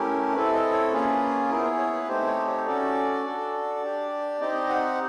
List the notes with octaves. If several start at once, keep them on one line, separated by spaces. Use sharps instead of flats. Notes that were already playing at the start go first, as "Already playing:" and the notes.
Already playing: A3 C#4 E4 G4 A#4
C4 E4 A4 B4
D#5
C#5
A#3 C#4 F4 G#4 B4
B3 E4 G#4 A#4
C5
C#5
C#5
B4
A3 C4 D#4 G4 C5
C#5
C#5
C#4 F#4 A4 D5
D4 F#4 A4
D4 G4
C4 D#4 G4 D#5
F#5